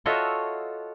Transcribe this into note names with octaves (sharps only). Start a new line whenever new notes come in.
F4 F#4 A4 C#5 D#5 E5